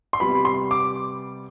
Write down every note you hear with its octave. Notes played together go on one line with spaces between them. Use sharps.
C6
C3 G3 B3 B5
C6
D6